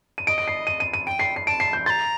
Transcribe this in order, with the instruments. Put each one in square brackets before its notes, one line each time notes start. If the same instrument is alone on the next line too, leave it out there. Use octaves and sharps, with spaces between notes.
[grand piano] D#7
[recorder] D#5 [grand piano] D7
[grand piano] D7
C7
D#7
D#7
D#7
[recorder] G5 [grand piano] D7
[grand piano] C7
C7
[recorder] A5 [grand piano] D7
[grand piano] C7
G6
[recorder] A#5 C6 [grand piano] A6